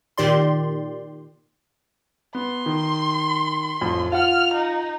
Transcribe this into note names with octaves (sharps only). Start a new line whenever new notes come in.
A#2 D#3 G4 D5 C6
B3 C6
D#3
A1 F2
F4 F#5 F6
D#4